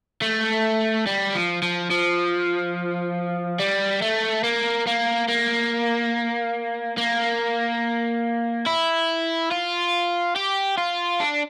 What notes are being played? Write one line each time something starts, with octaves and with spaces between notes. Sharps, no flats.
A3
G3
F3
F3
F3
G3
A3
A#3
A#3
A#3
A#3
E4
F4
G4
F4
D4